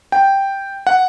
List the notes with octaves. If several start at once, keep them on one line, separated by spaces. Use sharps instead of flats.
G5
F#5